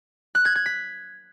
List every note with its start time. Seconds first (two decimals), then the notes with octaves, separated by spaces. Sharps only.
0.35 F#6
0.45 G#6
0.55 G#6
0.66 B6